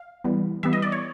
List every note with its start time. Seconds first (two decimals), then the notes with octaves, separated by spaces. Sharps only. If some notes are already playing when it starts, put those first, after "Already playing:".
Already playing: F5
0.24 E3 G3 B3
0.63 E3 G3 B3 E5
0.73 D#5
0.82 D5
0.92 C#5